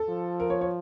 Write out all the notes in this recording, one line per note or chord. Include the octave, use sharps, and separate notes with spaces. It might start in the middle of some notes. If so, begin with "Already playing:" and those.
Already playing: A4
F3
A#4
C#5
C#5